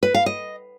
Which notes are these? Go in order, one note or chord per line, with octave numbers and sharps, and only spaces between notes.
B4
F5
D#5